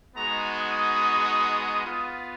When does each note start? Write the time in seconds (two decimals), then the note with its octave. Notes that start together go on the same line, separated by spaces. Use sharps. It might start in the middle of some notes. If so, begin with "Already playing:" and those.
0.16 G#3 B3 D#4 F#4 A#5
0.59 D#6
1.85 B3 F4